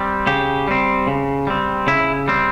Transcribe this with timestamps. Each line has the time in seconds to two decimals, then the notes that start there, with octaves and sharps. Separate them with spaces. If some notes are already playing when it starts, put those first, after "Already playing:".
Already playing: G3 C4
0.27 C#3 G4
0.68 G3 C4
1.07 C#3
1.47 G3 C4
1.87 C#3 E4
2.28 G3 C4